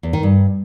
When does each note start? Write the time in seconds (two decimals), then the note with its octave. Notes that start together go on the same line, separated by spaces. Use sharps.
0.03 E2
0.13 D#3
0.23 G2